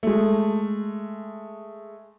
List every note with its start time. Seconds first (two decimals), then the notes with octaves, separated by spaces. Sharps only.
0.03 G#3 A3